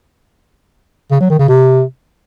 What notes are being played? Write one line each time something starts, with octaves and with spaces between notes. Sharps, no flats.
C#3
F#3
D#3
C#3
C3